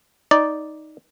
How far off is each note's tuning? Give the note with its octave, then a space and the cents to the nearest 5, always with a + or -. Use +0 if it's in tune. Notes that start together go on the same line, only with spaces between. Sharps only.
D#4 +5 D5 -5